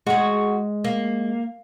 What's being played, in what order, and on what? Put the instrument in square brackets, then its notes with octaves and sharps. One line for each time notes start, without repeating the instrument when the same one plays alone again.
[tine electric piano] G#3 [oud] F#4 G#4
[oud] A#3